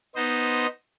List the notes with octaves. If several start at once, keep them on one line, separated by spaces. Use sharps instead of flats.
B3 D#4 C5 D#5